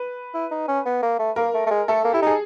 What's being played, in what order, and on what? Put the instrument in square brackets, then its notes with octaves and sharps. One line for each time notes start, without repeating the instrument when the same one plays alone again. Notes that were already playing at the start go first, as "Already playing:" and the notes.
Already playing: [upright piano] B4
[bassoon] E4
D#4
C#4
B3
A#3
A3
[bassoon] A#3 [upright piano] A#4
[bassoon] A3
A3
G#3
[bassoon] A3 [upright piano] A4
[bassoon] A#3
[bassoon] E4 [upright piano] G4
[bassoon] D#4 [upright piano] G#4